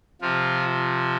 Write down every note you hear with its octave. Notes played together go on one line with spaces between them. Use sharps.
C3 F3 F4